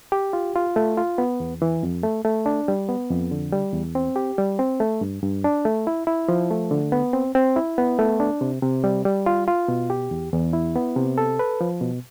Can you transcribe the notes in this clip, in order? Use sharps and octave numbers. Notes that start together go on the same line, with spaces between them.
G4
F4
F4
A3
F4
B3
E2
E3
F2
A3
A3
D4
G3
B3
F2
D3
G3
E2
C4
G4
G3
C4
A3
G2
G2
D4
A3
E4
E4
F3
A3
D3
B3
C4
C4
E4
B3
A3
D4
C3
C3
G3
G3
F4
F4
B2
G4
E2
E2
E4
B3
C3
A4
B4
F3
B2